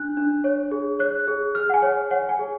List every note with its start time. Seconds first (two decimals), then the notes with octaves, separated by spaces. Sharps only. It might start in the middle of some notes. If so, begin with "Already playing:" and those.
Already playing: D4 F#6
0.17 D4
0.44 C#5
0.71 G#4
0.99 C#5 F#6
1.28 G#4
1.55 G#4 F6
1.70 F#5
1.74 G#5
1.82 C#5
2.11 C#5 F#5
2.29 G#5
2.39 G#4